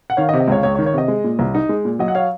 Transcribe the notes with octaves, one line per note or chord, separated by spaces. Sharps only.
F#5
D#3 C#5 F5
D#5
C3
D#5
C#2 C#5 F5
C#2 C#5
C#5
D#3
C#5
C3 D#5
G#3
A#2
C2
D#4
G#3
A#2
F#3 D#5
F#5
C#5 F5